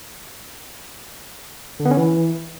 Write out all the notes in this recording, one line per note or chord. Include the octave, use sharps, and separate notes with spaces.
D3
B3
C#4
E3